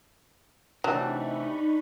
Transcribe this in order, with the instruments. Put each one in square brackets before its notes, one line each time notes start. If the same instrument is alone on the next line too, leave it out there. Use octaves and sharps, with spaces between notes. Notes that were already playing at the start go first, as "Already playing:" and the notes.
[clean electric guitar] C3 E3 A3 [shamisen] F#3 [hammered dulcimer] D4 [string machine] D#4 B5 C#6